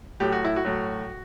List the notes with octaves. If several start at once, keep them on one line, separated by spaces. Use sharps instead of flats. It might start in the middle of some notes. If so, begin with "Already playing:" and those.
A2 F#3 G4
F#4
E4
F#4
A2 F#3